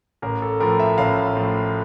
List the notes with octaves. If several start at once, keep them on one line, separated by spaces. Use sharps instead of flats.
A1 A#4
A4
A2 F3 A#4
E5
A1 F5
A2 F3